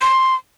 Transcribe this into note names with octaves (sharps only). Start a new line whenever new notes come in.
C6